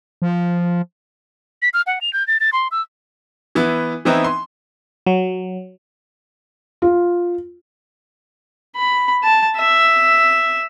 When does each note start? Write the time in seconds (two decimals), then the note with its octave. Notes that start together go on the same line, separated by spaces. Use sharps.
0.22 F3
1.62 B6
1.74 F6
1.87 F#5
2.01 F7
2.13 G6
2.27 A6
2.40 A6
2.52 C6
2.71 E6
3.55 E3 B3 E4
4.05 E3 B3 C4 D#4 E4
4.24 C6
5.06 F#3
6.82 F4
8.76 B5
9.24 A5
9.57 E5